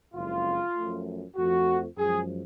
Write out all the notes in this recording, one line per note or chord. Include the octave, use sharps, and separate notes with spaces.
F#1 F2 C#3 G#3 F4
F#2 F3 A3
F2 F3 A3 F#4
F#2 F3 G#3 G#4